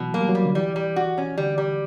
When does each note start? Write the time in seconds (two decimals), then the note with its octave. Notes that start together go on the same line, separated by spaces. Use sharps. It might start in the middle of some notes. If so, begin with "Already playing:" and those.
Already playing: B2 E3 F#3
0.14 F#3 A#3
0.21 G3
0.29 F#3
0.35 G3
0.45 D3
0.55 E3 G3
0.76 G3
0.96 F#4
1.18 C#4
1.38 D3 G3
1.58 G3